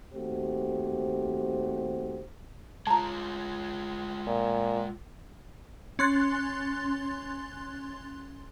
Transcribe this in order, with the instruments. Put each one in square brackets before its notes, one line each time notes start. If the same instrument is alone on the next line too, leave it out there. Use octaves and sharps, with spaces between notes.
[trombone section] D#2 A3 C4 F#4 G4 C5
[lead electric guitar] G#3 F4 [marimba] A5 A#5
[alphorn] A#2
[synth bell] C#4 C6 F#6 A6